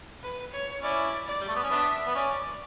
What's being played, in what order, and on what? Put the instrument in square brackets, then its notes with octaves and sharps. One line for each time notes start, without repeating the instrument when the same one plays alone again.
[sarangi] B4
C#5
[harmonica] C#4 E4 [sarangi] D5
[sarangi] D5
[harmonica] G3
A3
B3
C#4
[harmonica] B3 D4 [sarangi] E5
[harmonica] B3
[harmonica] C#4 [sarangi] D5